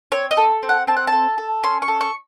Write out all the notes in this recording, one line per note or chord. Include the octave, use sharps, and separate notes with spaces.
C4 C#5
D#5
A4
C4
F#5
C4 A5
F#5
A4 A5
A4
C#4 C6
C#6
A4
C#6